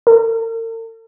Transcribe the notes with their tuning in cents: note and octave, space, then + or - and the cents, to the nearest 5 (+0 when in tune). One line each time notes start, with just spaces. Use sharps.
A#4 -45